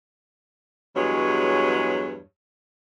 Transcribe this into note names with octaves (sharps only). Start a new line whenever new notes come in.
E2 G2 F#3 G#3 C#5